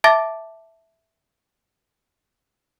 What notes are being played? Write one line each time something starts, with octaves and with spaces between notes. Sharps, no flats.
E5 A5 D6 A6 A#6